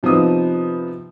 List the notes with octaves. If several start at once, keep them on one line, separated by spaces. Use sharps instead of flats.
C3 F3 B3 D#4 D#6